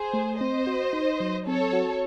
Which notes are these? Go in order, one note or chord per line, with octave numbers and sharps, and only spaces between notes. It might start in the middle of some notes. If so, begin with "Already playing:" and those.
Already playing: G#4 C5
A3
C4 C5 D#5
F#4
D#4
F#3
C4 A4 C#5
F#4